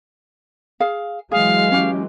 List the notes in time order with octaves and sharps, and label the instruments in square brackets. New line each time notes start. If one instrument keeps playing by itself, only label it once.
[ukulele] G#4 F5
[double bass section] E3 F#3 G#3 [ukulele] G#4 [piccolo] F5
[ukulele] C#4 G4